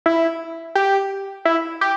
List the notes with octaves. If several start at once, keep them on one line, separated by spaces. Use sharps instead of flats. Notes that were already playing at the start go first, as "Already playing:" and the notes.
E4
G4
E4
G4